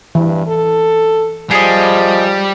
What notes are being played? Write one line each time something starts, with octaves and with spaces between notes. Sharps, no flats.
G2 E3
A4
F3 G3 G#4 D#5